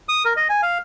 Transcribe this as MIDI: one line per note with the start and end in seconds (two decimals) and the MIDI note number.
0.09 0.23 87
0.25 0.33 70
0.36 0.48 75
0.50 0.61 80
0.62 0.78 77